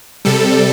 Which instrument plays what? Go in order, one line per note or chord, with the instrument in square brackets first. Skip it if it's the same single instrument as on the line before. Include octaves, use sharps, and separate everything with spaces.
[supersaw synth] C3 G3 A4